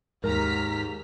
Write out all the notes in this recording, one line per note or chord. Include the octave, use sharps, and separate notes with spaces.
D#2 G#2 A#4 A#5 F6 B6